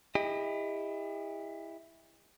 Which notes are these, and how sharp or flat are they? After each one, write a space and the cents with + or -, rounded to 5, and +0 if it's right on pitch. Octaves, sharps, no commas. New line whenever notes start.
E4 +0 G4 +45 D#5 +0